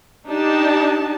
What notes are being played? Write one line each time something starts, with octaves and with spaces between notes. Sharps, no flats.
D4 D#4 G4 A5